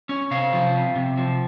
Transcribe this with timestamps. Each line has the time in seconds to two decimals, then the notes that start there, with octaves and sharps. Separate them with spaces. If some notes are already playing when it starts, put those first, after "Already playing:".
0.09 C#4
0.31 C3 F5
0.53 F3
0.74 C3
0.96 C3
1.17 F3